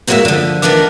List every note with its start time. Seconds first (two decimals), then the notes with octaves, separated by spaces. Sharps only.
0.07 G#2 F#3 G#3 A#3 F#4 E5
0.25 D3 F3
0.62 A3 B3 D4 D#4 G#4 A#4